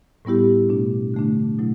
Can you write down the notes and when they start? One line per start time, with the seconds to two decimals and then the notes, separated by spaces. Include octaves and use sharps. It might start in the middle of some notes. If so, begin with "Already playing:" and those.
0.25 A2 G3 B3 E4 G4
0.69 B2 A3 D4
1.14 D3 A3 D4
1.59 B2 F#3 A3 E4